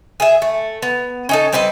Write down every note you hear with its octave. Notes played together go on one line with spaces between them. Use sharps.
G#4 E5
A3
B3
C#4 D#4 A4
G3 C4 B4 D#5